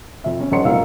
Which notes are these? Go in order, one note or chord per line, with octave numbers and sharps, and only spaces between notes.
F2 E5
C#4
F1 G2 C#5 F#5 C6 C#7
F#1 A#2 G#3 A#3 F5 E6